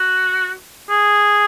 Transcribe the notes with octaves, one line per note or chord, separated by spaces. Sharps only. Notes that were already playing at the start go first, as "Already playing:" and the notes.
Already playing: F#4
G#4